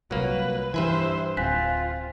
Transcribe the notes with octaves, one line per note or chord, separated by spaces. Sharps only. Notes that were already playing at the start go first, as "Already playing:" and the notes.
C2 A#2 F#3 A#3 B4
G2 E3 B4 C5 E5 G#5
D1 C4 F4 G#5 F#6 B6